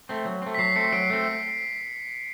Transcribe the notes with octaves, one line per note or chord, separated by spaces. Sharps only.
A3 C4
F#3
A3 C4
B6
F#3 C7
A3 C4 B6 C#7
F#3 C7 D7
A3 C4